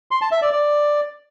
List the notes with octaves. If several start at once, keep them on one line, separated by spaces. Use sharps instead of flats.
C6
A5
E5
D5
D5